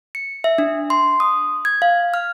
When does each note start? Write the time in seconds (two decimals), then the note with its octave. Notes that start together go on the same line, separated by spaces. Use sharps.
0.15 C#7
0.44 E5
0.58 D4
0.90 C6
1.20 D#6
1.65 G#6
1.82 F5
2.14 F6